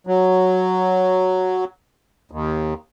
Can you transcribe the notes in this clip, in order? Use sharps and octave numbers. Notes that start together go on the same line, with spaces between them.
F#3
D#2